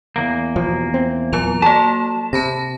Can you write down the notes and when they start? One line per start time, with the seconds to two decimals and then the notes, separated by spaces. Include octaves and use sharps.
0.16 E2 A#3
0.56 B2 F3
0.94 C4
1.33 E2 A#2 F#3 A#5 F7
1.62 F#3 A#3 A4 A5
2.33 C3 A5 B5 A#6